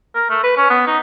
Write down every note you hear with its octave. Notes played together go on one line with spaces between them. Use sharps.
A#4
A3
B4
C#4
B3
D#4